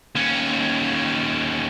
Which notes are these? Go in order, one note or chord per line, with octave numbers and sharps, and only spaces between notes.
D#2 C#4